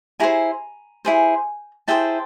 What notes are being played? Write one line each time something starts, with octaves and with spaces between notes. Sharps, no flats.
E4 G#4 C5 G#5 A#5
E4 G#4 C5
E4 G#4 C5 G5 A5